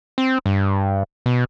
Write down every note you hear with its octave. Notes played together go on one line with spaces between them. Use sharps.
C4
G2
B2